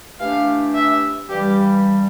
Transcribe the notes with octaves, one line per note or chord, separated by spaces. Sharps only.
E3 A3 D4 G4 F5
E5
G2 E3 G3 G4